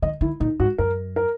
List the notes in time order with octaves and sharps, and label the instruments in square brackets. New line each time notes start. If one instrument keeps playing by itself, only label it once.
[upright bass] D#3 [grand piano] D#5
[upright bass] D#3 [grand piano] E4
[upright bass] A#2 [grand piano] D#4
[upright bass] G#2 [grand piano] F#4
[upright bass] F#2 [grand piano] A#4
[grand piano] A#4